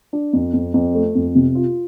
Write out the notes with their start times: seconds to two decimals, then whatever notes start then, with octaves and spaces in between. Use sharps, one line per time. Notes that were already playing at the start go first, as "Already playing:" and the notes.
0.13 D4
0.33 F2
0.54 F2
0.74 F2
0.94 A3
1.15 F2
1.35 C3
1.55 F4